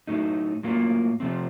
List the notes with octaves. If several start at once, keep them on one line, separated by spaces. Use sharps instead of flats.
A2 F#3 A3 D#4
A2 F#3 A#3 F4
C3 F3 A3 C4